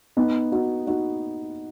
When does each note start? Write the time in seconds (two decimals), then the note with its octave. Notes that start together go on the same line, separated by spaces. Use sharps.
0.17 B3 D#4
0.52 D#4 F#4
0.87 D#4 F#4